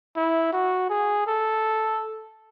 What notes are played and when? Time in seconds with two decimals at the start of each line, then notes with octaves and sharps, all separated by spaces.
0.16 E4
0.52 F#4
0.90 G#4
1.27 A4